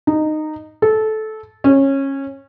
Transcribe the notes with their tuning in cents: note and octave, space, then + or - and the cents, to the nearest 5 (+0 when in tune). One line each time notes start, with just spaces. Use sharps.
D#4 -15
A4 -15
C#4 -20